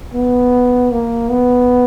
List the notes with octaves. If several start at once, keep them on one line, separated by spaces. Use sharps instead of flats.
B3
A#3
B3